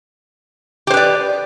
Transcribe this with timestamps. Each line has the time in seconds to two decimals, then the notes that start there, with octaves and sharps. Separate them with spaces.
0.87 G4
0.90 C5
0.94 B4
0.97 D5